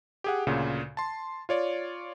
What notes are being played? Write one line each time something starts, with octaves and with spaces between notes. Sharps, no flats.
G4 G#4 F#5
D2 A#2 C#3
A5 C6
F4 C#5 D5